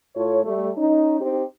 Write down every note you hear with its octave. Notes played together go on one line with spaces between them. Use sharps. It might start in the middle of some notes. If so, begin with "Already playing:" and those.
A2 F4 A4 C#5
G3 A3
C#4 D#4
C4 D#4 G4